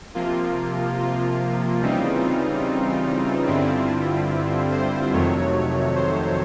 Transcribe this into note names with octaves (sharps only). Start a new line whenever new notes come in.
C3 F3 A#3 F4
F4
C#3 E3 G3 C4 D#4
G2 D3 G3 C4 E4
C5
F2 C3 D#3 F#3 A3 C#5
C5